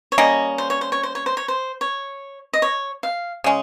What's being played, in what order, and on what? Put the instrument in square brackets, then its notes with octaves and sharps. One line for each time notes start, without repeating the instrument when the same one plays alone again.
[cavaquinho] C#5
[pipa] G3 A#3 C#4 [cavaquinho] D#5
[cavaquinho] C5
C#5
C5
C#5
C5
C#5
C5
C#5
C5
C#5
D#5
C#5
F5
[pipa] C#3 G#3 C#4